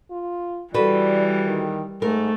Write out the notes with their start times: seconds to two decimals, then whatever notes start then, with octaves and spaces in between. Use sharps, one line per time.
0.11 F4
0.74 E3 G3 F#4 A4 B4 D5
1.47 D#3
2.02 G#2 A3 A#4